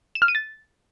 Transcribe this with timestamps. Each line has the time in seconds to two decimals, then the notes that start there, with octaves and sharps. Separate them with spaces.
0.15 E7
0.22 F6
0.28 D#7
0.35 A6